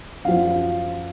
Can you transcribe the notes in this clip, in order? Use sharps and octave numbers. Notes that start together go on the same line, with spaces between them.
F#2 F3 F5